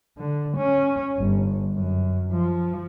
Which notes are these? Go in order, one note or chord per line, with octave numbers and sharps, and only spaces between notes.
D3
C#4
G1
F#2
F3